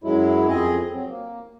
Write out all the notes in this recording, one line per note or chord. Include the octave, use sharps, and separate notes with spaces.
F#2 F#3 G#3 E4
F2 C4 G#4 D#5
F#3 C4
A#3